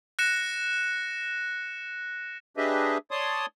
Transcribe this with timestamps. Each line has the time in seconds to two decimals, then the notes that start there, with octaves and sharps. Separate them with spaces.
0.19 F#6 A#6 C#7 E7
2.57 D4 G4 G#4 B4 D#5 E5
3.11 C#5 D5 A5 C6 D#6